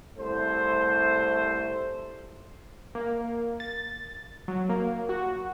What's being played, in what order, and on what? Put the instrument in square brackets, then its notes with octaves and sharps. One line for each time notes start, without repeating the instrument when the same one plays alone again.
[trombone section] C2 A3 C5
[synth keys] A#3
A6
F#3
A#3
F#4